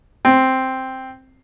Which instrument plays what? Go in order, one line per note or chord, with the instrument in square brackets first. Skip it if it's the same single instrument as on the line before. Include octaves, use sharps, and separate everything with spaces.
[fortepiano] C4